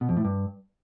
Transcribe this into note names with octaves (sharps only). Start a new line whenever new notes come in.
B2
F2
A2
G2